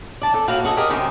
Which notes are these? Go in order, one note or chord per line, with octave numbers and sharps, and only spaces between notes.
D5 A5
A4
A2 A#3 F#4 B4 F5
F#4 G#4 A4 D#5
G4 G#4 A#4 D#5
F#2 C3 D#3